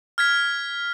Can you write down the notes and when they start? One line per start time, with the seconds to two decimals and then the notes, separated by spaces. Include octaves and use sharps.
0.18 F6 G#6 B6